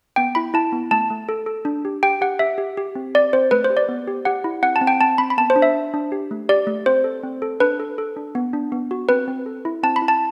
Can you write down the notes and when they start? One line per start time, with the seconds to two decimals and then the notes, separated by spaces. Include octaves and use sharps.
0.16 B3 G5
0.35 E4 B5
0.54 E4 A5
0.72 B3
0.91 A3 A5
1.10 A3
1.29 A4
1.46 A4
1.65 D4
1.85 G4
2.03 G4 G5
2.21 G4 F#5
2.39 G4 E5
2.58 G4
2.77 G4
2.95 C4
3.14 C4 D5
3.33 C4 C5
3.51 A3 B4
3.65 C5
3.70 G4
3.77 D5
3.89 B3
4.07 G4
4.25 G4 F#5
4.44 E4
4.63 C4 F#5
4.76 A5
4.81 C4
4.87 G5
5.01 C4 A5
5.18 C4 B5
5.30 B5
5.38 B3 A5
5.50 C5
5.56 D4
5.62 E5
5.75 D4
5.94 D4
6.12 G4
6.31 A3
6.49 G4 D5
6.67 A3
6.86 C4 C5
7.04 A4
7.23 C4
7.42 A4
7.60 D4 B4
7.80 A4
7.98 A4
8.16 D4
8.35 B3
8.53 D4
8.72 B3
8.91 F#4
9.09 C4 B4
9.28 C4
9.46 A4
9.65 E4
9.83 C4 A5
9.96 B5
10.02 E4
10.08 A5